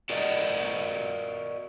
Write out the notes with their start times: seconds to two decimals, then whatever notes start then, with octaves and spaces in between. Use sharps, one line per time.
0.10 F#4 A#4 D5 D#5